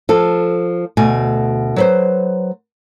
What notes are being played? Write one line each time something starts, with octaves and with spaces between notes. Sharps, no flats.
F3 A4
D2 B2 A3 G#5
F#3 B4 C5